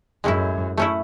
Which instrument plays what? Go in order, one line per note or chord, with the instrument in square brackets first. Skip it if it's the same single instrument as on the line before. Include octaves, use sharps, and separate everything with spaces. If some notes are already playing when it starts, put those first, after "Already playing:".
[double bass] F#2 [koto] A2 G#3 C#4 E4
[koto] A3 C#4 E4